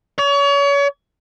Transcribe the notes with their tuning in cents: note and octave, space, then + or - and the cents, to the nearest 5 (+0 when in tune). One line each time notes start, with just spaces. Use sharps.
C#5 +35